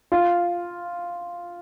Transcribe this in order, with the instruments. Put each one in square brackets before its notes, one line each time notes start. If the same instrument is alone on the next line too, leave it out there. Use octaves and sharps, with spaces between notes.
[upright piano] F4